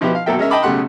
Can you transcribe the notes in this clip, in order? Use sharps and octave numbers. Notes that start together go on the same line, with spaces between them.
B2 F3 E4 F4 G4 B4
F5
B1 F#3 A#3 A4 E5 G5
G#3 C#4 A#4 E5
D#5 G5 A5 B5 D6
B1 C#3 A3 G4 F#5 C6